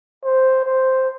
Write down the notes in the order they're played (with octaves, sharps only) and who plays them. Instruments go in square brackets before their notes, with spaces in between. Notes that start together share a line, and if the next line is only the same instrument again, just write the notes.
[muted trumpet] C5
C5